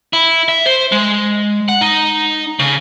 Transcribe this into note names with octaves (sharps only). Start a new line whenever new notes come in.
E4
E5
C5
G#3
F#5
D#4
C#3